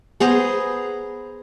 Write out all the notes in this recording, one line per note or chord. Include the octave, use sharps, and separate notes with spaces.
B3 G#4 C5 A#5